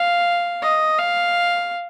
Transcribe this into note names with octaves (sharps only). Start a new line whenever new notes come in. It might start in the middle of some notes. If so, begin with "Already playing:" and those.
Already playing: F5
D#5
F5